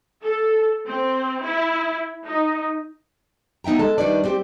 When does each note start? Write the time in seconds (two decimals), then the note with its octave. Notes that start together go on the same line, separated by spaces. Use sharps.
0.23 A4
0.86 C4
1.43 E4
2.25 D#4
3.64 B3 D#4 E5 G5 A#5
3.79 G#3 A4 A5
3.98 D#3 G3 D4 B4 D5
4.24 G3 C4 G4